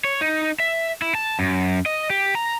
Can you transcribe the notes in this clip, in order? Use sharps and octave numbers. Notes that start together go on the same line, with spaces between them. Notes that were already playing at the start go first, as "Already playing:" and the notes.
C#5
D#4
E5
E4
A5
F#2
D#5
G4
A#5